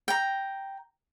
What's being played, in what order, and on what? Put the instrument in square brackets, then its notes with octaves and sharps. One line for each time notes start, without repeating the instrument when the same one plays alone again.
[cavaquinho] G5 A#5